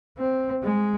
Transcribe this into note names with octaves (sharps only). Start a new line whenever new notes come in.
C4
G#3